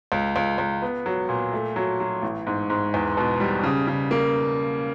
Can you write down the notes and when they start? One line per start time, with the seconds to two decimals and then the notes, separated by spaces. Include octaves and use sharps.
0.12 C#2
0.36 C#2
0.58 C#2
0.82 B3
1.06 F#3
1.29 A#2
1.53 A3
1.76 F#3
2.00 F#3
2.22 A1
2.47 G#2
2.70 G#2
2.94 E2
3.17 B2
3.40 G3
3.63 C#3
3.87 C#3
4.11 A#3